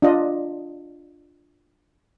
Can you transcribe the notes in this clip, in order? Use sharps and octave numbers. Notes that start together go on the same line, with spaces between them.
D4 F4 D#5